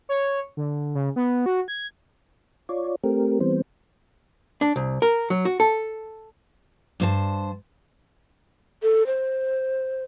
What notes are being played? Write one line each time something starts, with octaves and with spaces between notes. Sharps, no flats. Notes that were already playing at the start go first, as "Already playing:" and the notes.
C#5
D3
C#3
B3
F#4
G#6
F4 C#5 D5
A3 C4 G4 A#4
E3 G3 B3 C4 C5
D4
C2
A#4
F#3
F#4
A4
G2 C5 A5
A4
C5